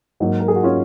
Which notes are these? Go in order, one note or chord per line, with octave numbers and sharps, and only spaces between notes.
G#2 F#3 A#3 D#4
A#4
G#4
F#4
C#4 F4